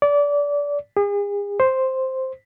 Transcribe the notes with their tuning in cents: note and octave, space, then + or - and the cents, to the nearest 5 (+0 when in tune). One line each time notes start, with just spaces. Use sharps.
D5 -25
G#4 -40
C5 +0